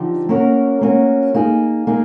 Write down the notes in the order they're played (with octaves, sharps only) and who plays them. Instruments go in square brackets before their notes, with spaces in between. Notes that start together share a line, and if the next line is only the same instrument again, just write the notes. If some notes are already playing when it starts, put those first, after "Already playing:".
Already playing: [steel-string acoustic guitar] D3 F3 D#4 G4
A#3 C#4 F#4 A#4
A#3 C#4 F#4 A#4
A#3 D#4 G#4
A#3 D#4 G#4